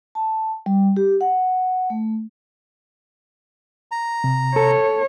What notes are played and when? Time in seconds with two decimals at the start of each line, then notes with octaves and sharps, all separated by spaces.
0.15 A5
0.66 G3
0.97 G4
1.21 F#5
1.90 A3
3.91 A#5
4.24 C3
4.56 A4 C#5